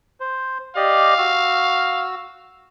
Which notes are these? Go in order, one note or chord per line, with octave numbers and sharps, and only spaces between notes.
C5
G4 D5 D#5 F5
F#4 E6